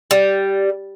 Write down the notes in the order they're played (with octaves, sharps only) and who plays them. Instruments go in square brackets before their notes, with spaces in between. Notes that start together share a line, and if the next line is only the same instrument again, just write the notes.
[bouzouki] G3